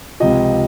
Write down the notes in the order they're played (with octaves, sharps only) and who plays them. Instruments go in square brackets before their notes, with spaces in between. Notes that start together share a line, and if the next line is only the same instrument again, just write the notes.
[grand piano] C#2 C3 F3 D#5